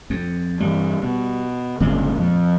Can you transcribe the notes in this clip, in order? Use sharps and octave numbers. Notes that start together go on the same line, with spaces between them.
F2
G2 E3 G3
B2
G1 G2 A#2 C#3 G#3
F2